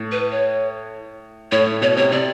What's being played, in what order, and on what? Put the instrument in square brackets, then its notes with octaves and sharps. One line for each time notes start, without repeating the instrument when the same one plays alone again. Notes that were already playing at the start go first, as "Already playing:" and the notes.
Already playing: [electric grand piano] A2
[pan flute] B4
C#5
[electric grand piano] A2 [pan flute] C#5
[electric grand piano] A2
[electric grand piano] B2 [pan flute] C#5
[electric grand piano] C3 [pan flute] C#5
[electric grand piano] C3 [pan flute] D5